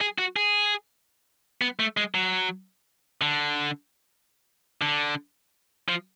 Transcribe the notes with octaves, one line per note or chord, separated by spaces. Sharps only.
G#4
F#4
G#4
B3
A3
G#3
F#3
D3
D3
F3